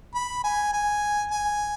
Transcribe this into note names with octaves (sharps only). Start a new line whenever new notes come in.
B5
G#5
G#5
G#5